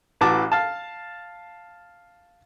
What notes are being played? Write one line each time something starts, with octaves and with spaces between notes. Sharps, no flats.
A1 E3 F#4 A5 D6
F5 A5